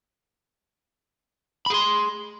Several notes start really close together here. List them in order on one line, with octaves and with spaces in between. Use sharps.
B5 G#4 C6